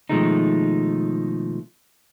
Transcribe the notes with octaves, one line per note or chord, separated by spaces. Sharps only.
B2 D#3 F3 G#3 A3 D#4